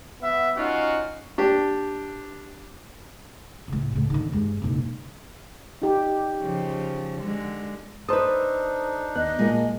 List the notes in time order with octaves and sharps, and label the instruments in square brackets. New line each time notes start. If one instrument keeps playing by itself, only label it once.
[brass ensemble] B3 E5
C#4 D#4 F4 F#4
[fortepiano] D4 G4
[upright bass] C#2 A2
C#2 A2
D3 D#3
G2 G#3
F#1 B1
[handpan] D#4 G4
[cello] C#3 F3
D3 G#3
[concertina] D4 D#4 [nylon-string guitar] A4 B4 [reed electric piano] C5 D#6
[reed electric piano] D#2 B3 F#6 [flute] D#5
[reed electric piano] A#2 F#3 A#3 [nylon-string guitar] G#3